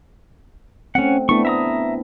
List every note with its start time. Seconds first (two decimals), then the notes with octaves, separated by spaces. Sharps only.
0.95 A3 C4 C#4 F#5
1.29 A3 B3 D4 E4 C#6
1.45 E5 A#5 D#6